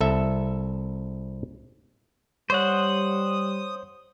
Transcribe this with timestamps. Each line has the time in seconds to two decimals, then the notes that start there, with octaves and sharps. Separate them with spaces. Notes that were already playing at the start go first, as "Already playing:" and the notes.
0.01 C2 A4 E5
2.50 G3 C5 C#5 F#5 C#6 D#6